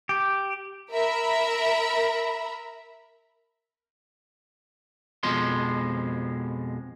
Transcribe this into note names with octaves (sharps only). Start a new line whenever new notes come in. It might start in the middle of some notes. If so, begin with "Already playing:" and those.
G4
A#4 E5 A#5 B5
F2 B2 F3 G#3 C6